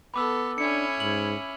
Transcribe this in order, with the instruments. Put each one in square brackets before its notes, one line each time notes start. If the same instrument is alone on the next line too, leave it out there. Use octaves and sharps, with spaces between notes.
[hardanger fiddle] B3 A4 [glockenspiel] B5 D6 E6
[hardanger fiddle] C#4 E4 [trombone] D4 [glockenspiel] C#7
[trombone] G#2 [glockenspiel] F#7